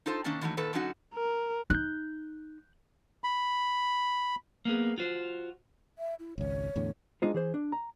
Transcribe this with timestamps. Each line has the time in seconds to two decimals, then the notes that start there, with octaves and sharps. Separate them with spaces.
0.06 D#4 F4 A4 C5
0.24 C3 D#3 A#3 C#4 D4
0.41 D#3 E3 F#3 A3 A#3
0.57 A#2 D#3 A4 B4
0.73 D3 F#3 C#4 D#4 E4 F#4
1.14 A#4
1.70 D#4 F#6 G6
3.24 B5
4.65 A#3 B3 G#4
4.98 F4 F#4 C5
5.98 E5
6.19 E4
6.38 G#1 C#2 C#5
6.76 E2 A2 D3
7.22 G#3 D4 D#4 F4 C5
7.34 E3 G#4 C5
7.54 D4
7.72 A#5